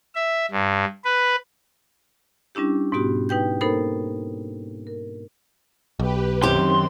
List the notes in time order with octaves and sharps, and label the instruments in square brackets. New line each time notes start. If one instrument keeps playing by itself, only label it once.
[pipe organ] E5
G2
B4
[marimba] G3 C#4 D4 E4 G4
G#2 B2 B3 F#4 G4
D#4 B4 G5 G6
A#3 D#4 A4 A#4 C5 B5
A#4
[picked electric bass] B1 [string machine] G4 B4
[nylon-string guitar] F#2 G4 [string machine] D#3 C4 [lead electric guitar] C6